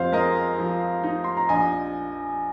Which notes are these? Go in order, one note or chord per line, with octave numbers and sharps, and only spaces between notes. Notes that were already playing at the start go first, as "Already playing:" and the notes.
Already playing: F2 C5 F5
G#3 A#4 D#5
F3
D#4
C6
A#5
A#1 D#5 G#5